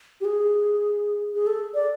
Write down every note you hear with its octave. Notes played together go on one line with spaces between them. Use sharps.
G4
G#4
G#4
A4
D5